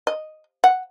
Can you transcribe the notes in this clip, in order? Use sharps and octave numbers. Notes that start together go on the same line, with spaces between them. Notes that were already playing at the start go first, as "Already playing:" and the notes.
D#5
F#5